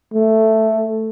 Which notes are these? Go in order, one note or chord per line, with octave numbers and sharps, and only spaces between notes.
A3